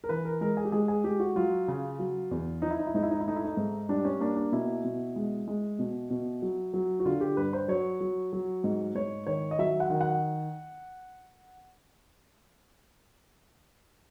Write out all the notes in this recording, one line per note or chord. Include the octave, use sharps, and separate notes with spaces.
A#4
E3 B4
A#4
G#3 A#4
G#4
G4
G#3 G#4
G#4
G#3 G4
F#4
F#3 F4
C#3
F#3
E2
F3 D#4
E4
D#4
E4
G#2 D#4
E4
D#4
E4
A3 D#4
E4
D#4
G#2
G3 D4
C#4
A#3 D4
D4
B2 E4
B2
G#3
G#3
B2
B2
F#3
F#3
F#4
D3 F4
G4
G2 B4
C5
F#3 C#5
F#3
F#3
G#2
G#2 C#5
D#3 C#5
D#5
F#3 E5
F#5
D#3
F#5